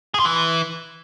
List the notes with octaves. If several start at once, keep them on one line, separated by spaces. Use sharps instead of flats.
G#4
F4
E3